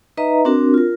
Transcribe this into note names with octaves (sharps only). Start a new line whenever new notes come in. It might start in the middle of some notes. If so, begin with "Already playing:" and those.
D#4 B4 D#5 E5 A#5
C4 D4 F#4 A#4
F4 A#4